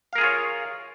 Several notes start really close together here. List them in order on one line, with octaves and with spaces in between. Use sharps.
F5 A#4 G#4 F4 C#5